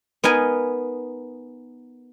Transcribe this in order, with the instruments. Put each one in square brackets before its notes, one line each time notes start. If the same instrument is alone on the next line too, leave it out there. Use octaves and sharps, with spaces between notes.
[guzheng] B3 D#4 A#4 G#5